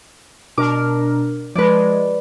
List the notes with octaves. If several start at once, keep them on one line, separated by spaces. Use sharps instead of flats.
B2 D4 A#4 D6
F3 G#3 B4 D5